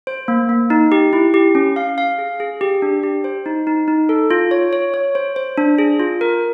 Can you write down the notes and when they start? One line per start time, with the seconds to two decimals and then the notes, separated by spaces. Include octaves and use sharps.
0.07 C5
0.28 A#3
0.49 A#3
0.70 D#4
0.92 G4
1.13 E4
1.34 G4
1.55 C#4
1.76 F5
1.98 F5
2.19 G#4
2.40 G#4
2.61 G4
2.82 D4
3.03 G4
3.24 C5
3.46 D#4
3.67 D#4
3.88 D#4
4.09 A4
4.31 F4
4.51 C#5
4.73 C#5
4.94 C#5
5.15 C5
5.36 C5
5.58 D4
5.78 G#4
6.00 F4
6.21 A#4